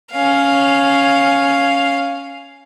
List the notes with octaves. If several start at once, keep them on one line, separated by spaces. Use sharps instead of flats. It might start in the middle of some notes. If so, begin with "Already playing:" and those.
C#4 F5